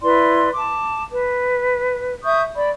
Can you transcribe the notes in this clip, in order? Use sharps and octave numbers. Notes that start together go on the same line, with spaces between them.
E4 B4 D5 C6
A5 D6
B4
E5 C#6 D#6 G6
D5 B5